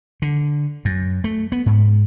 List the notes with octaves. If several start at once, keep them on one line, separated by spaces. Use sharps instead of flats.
D3
F#2
A3
B3
G#2